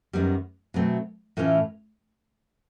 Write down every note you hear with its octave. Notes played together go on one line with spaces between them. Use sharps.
F#2 D#3 G3 B3
B2 F#3 A3 C4
A2 E3 A3 C#4 F4